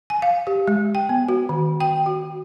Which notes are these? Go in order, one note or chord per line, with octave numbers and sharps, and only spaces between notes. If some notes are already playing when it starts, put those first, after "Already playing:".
G#5
F5
G4
G#3
G5
B3
F#4
D#3
G5
F#4